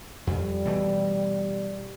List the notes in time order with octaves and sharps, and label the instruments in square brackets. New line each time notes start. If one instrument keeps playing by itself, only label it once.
[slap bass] F2 [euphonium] G3
[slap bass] B2 E3 A3